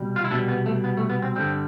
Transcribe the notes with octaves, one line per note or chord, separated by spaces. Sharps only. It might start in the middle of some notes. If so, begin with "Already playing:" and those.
Already playing: C2 B2 G3
F4
E4
C2 B2 G3 D4
B3
A3
B3
A3
B3
C4
G2 D3 G3 C4